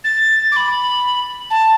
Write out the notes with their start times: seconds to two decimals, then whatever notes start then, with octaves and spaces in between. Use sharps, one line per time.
0.04 A6
0.52 D6
0.56 B5
1.50 A5